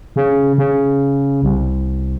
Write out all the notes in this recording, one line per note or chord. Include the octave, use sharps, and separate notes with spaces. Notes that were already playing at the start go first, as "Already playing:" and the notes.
C#3
C#3
C2